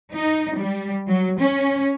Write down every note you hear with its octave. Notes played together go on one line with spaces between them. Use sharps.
D#4
G3
F#3
C#4